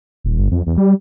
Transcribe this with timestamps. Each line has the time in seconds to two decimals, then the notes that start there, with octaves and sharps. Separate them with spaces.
0.24 D#1
0.38 G1
0.51 F2
0.66 E2
0.78 G3